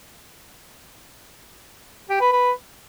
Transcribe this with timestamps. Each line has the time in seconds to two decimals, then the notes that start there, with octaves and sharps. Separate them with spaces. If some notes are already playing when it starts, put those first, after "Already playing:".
2.10 G4
2.21 B4
2.32 B4